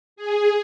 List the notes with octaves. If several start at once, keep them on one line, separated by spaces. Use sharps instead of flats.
G#4